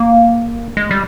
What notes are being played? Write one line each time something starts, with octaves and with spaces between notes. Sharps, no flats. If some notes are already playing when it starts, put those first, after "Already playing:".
Already playing: A#3
G#3
G3